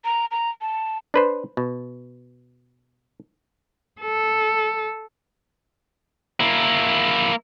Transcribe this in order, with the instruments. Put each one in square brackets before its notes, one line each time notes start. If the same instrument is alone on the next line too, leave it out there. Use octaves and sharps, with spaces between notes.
[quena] A#5
A#5
A5
[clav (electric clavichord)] D4 B4 C5
B2
[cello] A4
[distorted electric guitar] A#3 E4